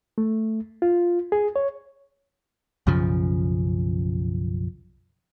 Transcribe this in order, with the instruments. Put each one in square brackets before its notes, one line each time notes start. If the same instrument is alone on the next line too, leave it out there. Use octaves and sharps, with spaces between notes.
[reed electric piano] A3
F4
G#4
C#5
[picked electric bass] B1 F#2 C#3 F3